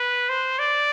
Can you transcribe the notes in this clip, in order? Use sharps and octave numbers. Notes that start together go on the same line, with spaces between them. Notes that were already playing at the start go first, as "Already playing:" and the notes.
Already playing: B4
C5
D5